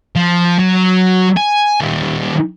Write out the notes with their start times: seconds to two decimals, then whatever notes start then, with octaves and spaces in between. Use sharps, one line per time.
0.16 F3
0.59 F#3
1.37 G#5
1.81 D#3 G3